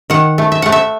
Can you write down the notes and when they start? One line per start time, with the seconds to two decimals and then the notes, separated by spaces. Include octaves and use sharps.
0.10 D#3 F#5
0.38 A3
0.52 E5
0.62 A3 F#5
0.72 E5